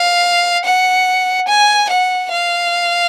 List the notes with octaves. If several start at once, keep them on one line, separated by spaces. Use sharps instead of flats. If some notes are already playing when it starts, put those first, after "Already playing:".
Already playing: F5
F#5
G#5
F#5
F5